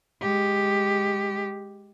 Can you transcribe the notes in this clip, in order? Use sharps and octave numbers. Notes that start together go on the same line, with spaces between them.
G#3 G4